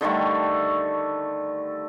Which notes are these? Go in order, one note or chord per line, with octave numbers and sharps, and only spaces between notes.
D3 D#3 G3 A3